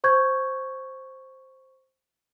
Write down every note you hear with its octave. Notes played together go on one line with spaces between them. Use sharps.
C5 C#6 G6 G#6